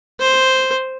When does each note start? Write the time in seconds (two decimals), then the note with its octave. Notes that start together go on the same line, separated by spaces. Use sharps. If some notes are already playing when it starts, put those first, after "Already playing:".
0.20 C5